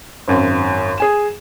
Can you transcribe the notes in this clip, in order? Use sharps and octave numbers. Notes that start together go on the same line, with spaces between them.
G#1 F#2
G#4 G#5 E7